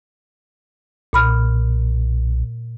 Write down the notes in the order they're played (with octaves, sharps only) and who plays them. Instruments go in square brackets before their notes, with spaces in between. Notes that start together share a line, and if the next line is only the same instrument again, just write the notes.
[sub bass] B1 [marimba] A#2 B5 F6